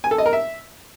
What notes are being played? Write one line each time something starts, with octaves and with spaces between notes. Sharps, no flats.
G#5
A4
D#5
A#4
E5